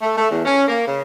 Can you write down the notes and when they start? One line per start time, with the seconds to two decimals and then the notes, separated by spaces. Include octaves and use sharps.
0.02 A3
0.17 A3
0.30 E2
0.45 C#4
0.68 A#3
0.85 C#3